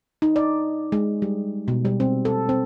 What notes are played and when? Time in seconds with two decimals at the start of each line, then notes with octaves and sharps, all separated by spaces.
0.22 D#4
0.36 D5
0.92 G#3
1.22 G3
1.68 B2
1.85 G3
2.00 C4
2.25 A4
2.49 C4